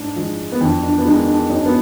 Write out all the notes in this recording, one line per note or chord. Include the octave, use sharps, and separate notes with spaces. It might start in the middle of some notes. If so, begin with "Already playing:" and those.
Already playing: G#2 D4
F3 G#3
B3
F2 D4
D4
B3
D#3 G#3 D4
D4
F#2 D#4
D4
B3